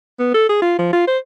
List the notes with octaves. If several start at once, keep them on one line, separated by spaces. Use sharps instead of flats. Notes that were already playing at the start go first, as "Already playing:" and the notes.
B3
A4
G#4
F4
F3
F4
C5